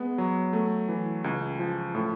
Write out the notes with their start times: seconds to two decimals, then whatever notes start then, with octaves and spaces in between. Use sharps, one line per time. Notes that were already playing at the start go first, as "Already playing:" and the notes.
Already playing: G#3 B3
0.18 F#3
0.53 A3
0.88 E3
1.24 C#2
1.59 F3
1.95 A2